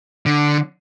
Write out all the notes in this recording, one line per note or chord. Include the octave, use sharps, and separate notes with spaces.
D3